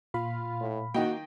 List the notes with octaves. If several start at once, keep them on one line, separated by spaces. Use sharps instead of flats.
A#2 F4 F5 B5
A2
D#3 A#3 F#4 D#5 G5